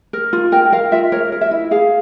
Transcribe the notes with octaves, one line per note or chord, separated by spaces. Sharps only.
A#4
F4
A#4 G5
A#4 F5
F4 E5
A#4 C#5
A#4
E5
E4
G#4 F5